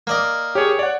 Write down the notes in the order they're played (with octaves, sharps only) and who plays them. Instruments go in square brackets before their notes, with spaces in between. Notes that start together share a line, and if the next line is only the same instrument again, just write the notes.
[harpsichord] A#3 D5 D#5
[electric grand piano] G4 G#4 [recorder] C#5
[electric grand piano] D5 F#5